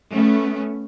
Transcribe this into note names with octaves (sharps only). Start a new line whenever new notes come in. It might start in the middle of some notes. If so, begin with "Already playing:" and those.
A3 B3 C#4